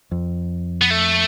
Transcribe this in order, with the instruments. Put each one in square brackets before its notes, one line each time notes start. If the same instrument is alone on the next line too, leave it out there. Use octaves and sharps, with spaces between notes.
[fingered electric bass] F2
[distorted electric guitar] B3
A3